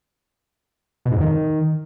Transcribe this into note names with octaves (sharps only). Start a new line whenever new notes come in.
B2
G#2
F2
D#3